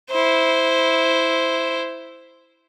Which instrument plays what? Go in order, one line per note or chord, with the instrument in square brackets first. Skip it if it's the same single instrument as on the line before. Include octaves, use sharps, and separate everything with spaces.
[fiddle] E4 C5